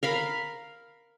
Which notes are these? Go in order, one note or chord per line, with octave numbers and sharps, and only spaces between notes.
A#4 F5 B5